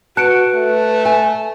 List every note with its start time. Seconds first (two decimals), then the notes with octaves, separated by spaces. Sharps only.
0.17 F#4 B4 A5 F#6 C#7 D7
0.54 A3
1.05 G#5